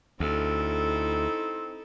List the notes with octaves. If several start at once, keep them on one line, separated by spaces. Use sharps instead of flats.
D2 C4 D#4 E4 A4